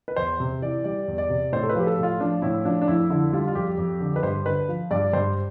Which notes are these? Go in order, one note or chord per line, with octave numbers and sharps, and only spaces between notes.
B4
E2 C5
C3
E3 D5
G3 D5
E2
D5
C3
A2 C5
A4
B4
F3 G4
A4
A2
F4
F3 D4
A2 E4
F3 D4
D4
F2 E4
D3 E4
G3 F4
F4
F2 G4
F2
D3
B4
G2 C5
D3 B4
F3
G2 D5
G2 C5